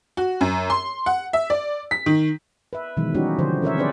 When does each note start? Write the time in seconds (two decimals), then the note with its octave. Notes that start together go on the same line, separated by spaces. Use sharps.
0.17 F#4
0.41 F#2
0.70 C6
1.06 F#5
1.33 E5
1.50 D5
1.91 B6
2.06 D#3
2.73 B4 E5
2.97 B2 D#3 E3 F#3 G#3
3.15 G3 C#4 D#4 E4 F#4 G4
3.39 D3 F3 C5
3.62 C#4 A#4 C#5 E5
3.77 C4 D4 G#4 B4 C5 D5